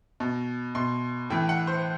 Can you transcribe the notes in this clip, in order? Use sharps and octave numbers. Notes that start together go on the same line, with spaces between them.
B2
B2 C6
A2 E3 G5
F#5
C5